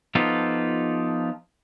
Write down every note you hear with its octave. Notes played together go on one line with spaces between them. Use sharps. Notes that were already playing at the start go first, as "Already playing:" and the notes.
F3 B3 D#4 F4 G4 A4